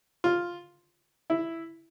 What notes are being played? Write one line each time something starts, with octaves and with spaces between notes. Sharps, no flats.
F4
E4